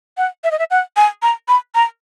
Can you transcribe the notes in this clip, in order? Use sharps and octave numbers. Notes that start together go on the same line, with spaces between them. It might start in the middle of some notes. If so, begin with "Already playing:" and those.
F#5
E5
D#5
E5
F#5
G#5
A#5
B5
A#5